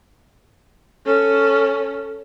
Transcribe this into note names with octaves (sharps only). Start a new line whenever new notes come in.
C#4 A4